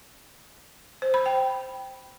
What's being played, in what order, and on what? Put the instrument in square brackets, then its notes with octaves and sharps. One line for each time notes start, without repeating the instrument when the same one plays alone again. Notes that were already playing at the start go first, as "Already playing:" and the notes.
[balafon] C5
B5
G5